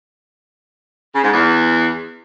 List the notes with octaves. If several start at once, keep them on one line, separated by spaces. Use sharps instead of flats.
C#3
G#2
E2